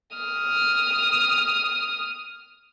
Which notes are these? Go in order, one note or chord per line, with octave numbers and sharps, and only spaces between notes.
D#6 F6